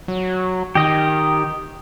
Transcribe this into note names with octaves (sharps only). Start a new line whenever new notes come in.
F#3
D#3 G4 D#5